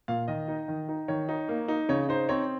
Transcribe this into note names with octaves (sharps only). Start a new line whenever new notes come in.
A#2 F5
D#3 D#5
D#4
D#3
D#4
D#3 C#5
D#4
A#3
D#4
C#3 C#5
D#4 C5
C4 C#5